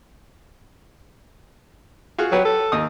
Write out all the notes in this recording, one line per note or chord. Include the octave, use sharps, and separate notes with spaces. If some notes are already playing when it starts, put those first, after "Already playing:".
F4 F#4 G#4
F#3 G4 B4
A4
D#2 D#4 D#6